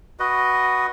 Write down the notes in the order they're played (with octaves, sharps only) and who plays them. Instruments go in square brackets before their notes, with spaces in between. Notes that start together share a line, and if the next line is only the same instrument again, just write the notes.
[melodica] F#4 B4 D#5